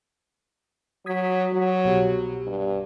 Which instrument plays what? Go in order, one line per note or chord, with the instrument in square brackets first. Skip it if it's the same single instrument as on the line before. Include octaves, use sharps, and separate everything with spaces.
[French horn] F#3 [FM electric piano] D#6 G#6 B6
[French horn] F#3
[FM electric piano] C2 B2 G4
[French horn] G2